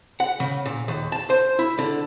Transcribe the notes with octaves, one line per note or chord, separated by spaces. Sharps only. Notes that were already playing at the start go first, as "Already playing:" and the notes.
F#5
C#3
A#2
D#2
A5
C5
E4
D3